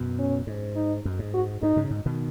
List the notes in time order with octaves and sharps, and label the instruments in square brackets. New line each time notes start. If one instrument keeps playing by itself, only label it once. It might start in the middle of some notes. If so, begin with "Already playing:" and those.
Already playing: [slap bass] F#2 B2
[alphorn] C#4
[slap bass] G#2
[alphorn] D#4
[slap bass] F#2
G#2
[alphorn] F#4
[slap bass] G#2 [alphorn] D#4
[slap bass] G#2 C#3
G#2
B2 D#3